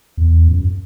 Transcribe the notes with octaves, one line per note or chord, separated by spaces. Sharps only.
E2
F#2